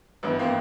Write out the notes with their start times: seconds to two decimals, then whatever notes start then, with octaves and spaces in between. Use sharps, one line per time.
0.23 G#1 G2 E3 B3
0.39 A#3 C4